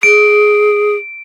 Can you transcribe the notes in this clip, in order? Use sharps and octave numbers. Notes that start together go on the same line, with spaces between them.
G#4 D7